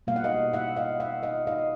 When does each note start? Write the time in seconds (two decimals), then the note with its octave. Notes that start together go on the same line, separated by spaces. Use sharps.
0.07 B2 G3 A#3 F5
0.16 F#5
0.24 D#5 F5
0.53 E5 F#5
0.77 D#5 F5
1.00 E5 F#5
1.23 D#5 F5
1.47 D#5 F5